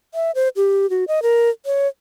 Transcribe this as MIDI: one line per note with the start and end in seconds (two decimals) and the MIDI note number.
0.14 0.31 76
0.35 0.48 72
0.56 0.89 67
0.90 1.05 66
1.08 1.22 75
1.23 1.50 70
1.66 1.88 73